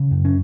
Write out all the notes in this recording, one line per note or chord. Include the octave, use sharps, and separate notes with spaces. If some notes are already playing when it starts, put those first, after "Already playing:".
Already playing: C#3
F#2
C#4